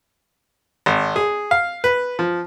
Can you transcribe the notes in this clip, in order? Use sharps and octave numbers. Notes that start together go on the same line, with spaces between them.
G#1
G#4
F5
B4
F3